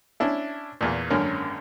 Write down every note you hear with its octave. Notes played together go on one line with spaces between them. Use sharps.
C#4 D4 E4
E2 A#2
G#1 F#2 D3 A#3 C#4 A#4